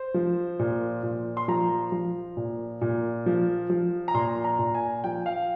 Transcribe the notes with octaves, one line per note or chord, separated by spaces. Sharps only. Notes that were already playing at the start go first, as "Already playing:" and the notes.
Already playing: C5
F3
A#2
A#2
C6
F3 A#5
F3
A#2
A#2
F3
F3
A#5
A#2 C6
A#5
A#2
G#5
F3 G5
F5